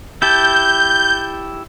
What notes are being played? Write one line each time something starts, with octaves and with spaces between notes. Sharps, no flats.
E4 G4 A5 G6